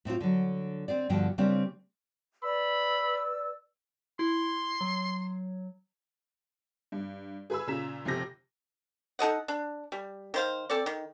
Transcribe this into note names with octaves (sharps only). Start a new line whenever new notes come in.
A2 C4 D#4 F4
D3 F#3
C4 G#4 D5
G2 B2 D3 F3 G5
C#3 G3 A#3 C4 D4
B4 D5 B5 E6
E4 C6
F#3
G2
G#4 B4 G#5 B5 E6
A#2 C#3 G#4 A#5 B6 E7
F1 F2 C3 A#6
D#4 A4 D#5 F#5
D4
G3
D#3 C5 F5
C4 A4 D5
D#3